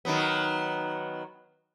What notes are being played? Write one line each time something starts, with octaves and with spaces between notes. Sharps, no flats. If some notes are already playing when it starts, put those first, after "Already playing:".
D#3 F#3 B3